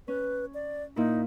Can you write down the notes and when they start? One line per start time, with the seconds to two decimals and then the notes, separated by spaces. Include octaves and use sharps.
0.08 C#4 B4
0.54 D5
0.96 A#2 D#4 E4